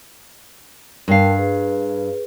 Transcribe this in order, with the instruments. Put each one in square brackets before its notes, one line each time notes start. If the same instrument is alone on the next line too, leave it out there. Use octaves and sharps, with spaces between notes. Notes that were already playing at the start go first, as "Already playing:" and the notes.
[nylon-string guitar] G2 F5 [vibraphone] A#4 G5 A5
[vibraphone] G#4 B4